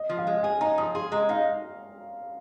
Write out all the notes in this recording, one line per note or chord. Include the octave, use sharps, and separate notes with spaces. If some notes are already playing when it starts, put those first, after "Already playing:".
Already playing: D#5
F3
F5
G#3
G#4 G#5
D#4 A#5
F3 D#6
G#4 C6
G#3 A#5
D#4 F5